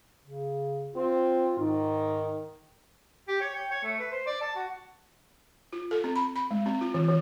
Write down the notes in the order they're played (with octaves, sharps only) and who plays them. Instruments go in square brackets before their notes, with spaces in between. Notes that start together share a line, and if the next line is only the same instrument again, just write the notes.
[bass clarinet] C#3
[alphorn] C4 [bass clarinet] F4
[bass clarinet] G#2 [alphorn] D#3
[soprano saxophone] G4
C#5
G5
C#5
A3
B4
C5
D5
A5
F#4
[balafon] F4
A4
C4
B5
B5
G#3
C4
F4
E3
E3